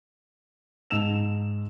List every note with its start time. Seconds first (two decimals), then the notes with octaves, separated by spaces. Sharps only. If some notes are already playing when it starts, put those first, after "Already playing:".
0.90 G#2 A5 E6 E7 F7